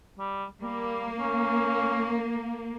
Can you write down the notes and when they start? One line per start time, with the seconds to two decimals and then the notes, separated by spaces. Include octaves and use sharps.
0.19 G3
0.61 G3 A#3
1.19 C#4